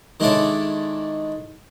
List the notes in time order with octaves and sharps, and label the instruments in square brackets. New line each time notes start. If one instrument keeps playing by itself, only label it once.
[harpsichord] D#3 G#3 D4 E4 A4 C#5